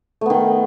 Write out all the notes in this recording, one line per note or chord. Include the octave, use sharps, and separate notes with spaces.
D#3 A3 B3